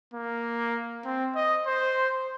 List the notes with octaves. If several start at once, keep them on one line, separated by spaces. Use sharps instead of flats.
A#3
C4
D#5
C5